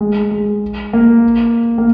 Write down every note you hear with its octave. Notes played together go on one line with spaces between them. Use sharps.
G#3
G#3
A#3
A#3